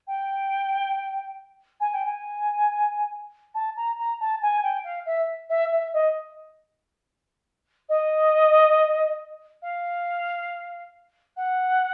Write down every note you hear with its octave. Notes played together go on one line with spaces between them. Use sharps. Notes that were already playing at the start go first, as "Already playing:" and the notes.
G5
G#5
G5
G#5
A5
A#5
A#5
A5
G#5
G5
F5
E5
E5
E5
D#5
D#5
F5
F#5